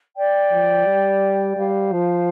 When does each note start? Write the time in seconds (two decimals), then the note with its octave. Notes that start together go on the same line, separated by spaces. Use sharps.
0.16 D5 G5
0.51 F3
0.86 G3
1.57 G3 C5 F5
1.93 F3